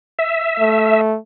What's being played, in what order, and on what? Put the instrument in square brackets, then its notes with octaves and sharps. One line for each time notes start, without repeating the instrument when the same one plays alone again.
[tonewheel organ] E5
[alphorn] A3